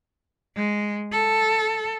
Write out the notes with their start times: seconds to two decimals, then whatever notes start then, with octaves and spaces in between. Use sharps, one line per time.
0.56 G#3
1.12 A4